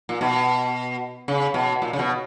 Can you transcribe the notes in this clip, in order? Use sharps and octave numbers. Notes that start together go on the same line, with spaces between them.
A#2
B2
C#3
B2
A#2
C#3
B2